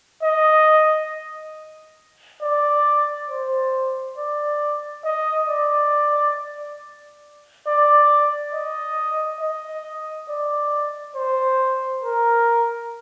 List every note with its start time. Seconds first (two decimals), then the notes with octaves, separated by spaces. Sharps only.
0.23 D#5
2.42 D5
3.29 C5
4.18 D5
5.05 D#5
5.48 D5
7.67 D5
8.54 D#5
9.41 D#5
10.29 D5
11.16 C5
12.03 A#4